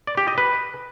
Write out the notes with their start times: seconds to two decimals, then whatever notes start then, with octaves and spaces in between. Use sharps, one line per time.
0.07 D5
0.17 G4
0.28 D#5
0.38 B4